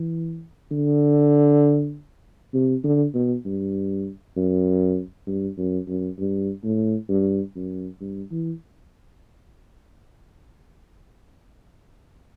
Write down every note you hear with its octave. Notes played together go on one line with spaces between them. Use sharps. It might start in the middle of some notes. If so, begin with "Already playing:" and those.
Already playing: E3
D3
C3
D3
B2
G2
F#2
G2
F#2
F#2
G2
A2
G2
F#2
G2
E3